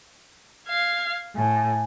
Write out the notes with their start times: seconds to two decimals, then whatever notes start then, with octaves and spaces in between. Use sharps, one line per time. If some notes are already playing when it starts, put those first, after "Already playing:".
0.66 F5 G#6
1.36 A2 G#5